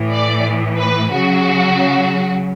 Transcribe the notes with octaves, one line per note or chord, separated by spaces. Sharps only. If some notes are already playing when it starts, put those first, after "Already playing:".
Already playing: A2 E3
D5
B4
C#3 F#3 F#4